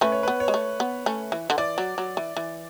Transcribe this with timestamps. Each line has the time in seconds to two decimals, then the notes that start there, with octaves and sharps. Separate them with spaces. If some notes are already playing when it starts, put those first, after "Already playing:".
0.01 A3 C#4 B4
0.12 C#5
0.23 B3 B4
0.40 C#5
0.48 G#3
0.54 A3
0.80 B3
1.06 A3 C#4
1.32 E3
1.50 D3
1.58 E3 D5
1.78 F#3
1.98 F#3
2.17 E3
2.37 E3